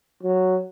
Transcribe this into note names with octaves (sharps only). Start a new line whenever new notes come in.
F#3